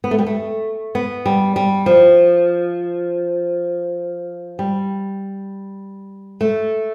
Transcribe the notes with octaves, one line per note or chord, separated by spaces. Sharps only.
B3
A3
G3
A3
B3
G3
G3
F3
G3
A3